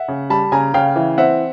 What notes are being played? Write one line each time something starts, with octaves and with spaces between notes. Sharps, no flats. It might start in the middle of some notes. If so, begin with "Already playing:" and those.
Already playing: E5 F#5
C#3
G3 A5 B5
C#3 G#5 A#5
C#3 F5 G5
E3
C4 E5 F#5